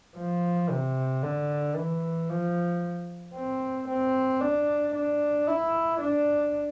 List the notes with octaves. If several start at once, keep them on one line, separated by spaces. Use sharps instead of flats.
F3
C3
D3
E3
F3
C4
C4
D4
D4
E4
D4